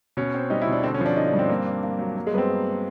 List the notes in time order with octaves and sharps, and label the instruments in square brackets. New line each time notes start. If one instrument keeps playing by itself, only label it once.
[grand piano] B2 [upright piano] C#4
[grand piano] C4
[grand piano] G3 [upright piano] D#4
[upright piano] E4
[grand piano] B2
[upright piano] D4
[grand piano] D3 [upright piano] C4
[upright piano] C#4
[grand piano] F3 [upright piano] D4
[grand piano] D3 [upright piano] D#4
[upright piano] D4
[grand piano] G2
[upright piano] C4
[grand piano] A#3
D4
A#3
F#3
A#3
[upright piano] G#3
[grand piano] G2 [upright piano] B3
[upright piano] C4
[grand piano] A#3